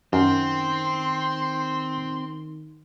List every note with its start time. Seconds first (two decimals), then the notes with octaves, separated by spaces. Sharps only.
0.13 F#2 D#3 C4 C6